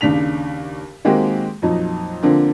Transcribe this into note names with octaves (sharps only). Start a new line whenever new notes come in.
D#2 C#3 D4 B6 F7
D#3 G#3 A#3 C4 F#4 G4
F2 A#2 F#3 D#4
D3 F3 A#3 C4 D4